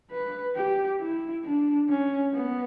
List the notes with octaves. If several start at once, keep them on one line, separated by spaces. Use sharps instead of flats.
B4
G4
E4
D4
C#4
B3